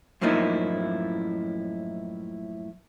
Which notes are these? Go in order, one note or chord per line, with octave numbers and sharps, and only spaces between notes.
F#2 A2 F3 A#3 D#4 E4